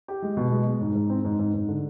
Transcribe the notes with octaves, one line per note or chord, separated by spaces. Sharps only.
G4
G#3
B2
G#3
G#3
G#2
G#2
C4
G#2
G#2
G#2
D3